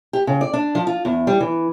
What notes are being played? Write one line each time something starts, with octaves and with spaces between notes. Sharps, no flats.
G4
C#3
D5
D4
F3
F4
E2
G3
E3